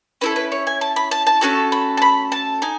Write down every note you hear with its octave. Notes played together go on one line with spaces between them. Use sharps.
C#4 E4 A4 B4
B4
C#5
G#5
A5
B5
A5
A5
A3 C#4 F#4 A4 A5
B5
A5
B5
A5
D#4 G#5